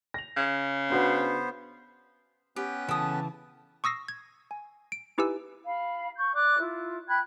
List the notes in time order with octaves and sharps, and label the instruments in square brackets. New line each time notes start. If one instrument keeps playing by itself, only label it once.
[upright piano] A#6 F7
[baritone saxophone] C#3
[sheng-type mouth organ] B3 C5 [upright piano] D4 F#4 B4
[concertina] B3 C#4 B4 [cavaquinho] G4
[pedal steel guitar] C#3 E3 G5 [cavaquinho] A4 D#6 [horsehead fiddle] A5
[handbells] C#6 D#6 E6 A#6 C7
G#6
G#5
D7
D#4 E4 G4 B4 G#5 E6
[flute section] F5 B5
C#6 G6
D5 D6 F#6
E4 F4
G5 B5 F#6 G#6